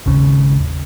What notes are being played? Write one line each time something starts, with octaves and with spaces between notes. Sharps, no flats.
G#1 D#2 C#3